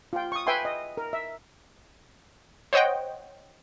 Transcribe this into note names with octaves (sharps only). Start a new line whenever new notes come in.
F4 G5
C#6 D#6
B4 E5 G5 G#5 C6
D#5
A#4
E5
C5 C#5 D#5 F#5 G5